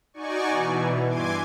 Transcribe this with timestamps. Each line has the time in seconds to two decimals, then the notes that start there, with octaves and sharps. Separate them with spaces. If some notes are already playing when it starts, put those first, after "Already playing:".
0.14 D#4 F#4 D5 G#5 C#6
0.48 B2 E3
1.07 G2 E3 G#5 C6 D6 G#6